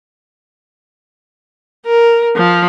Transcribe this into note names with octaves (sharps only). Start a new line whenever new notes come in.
A#4
F3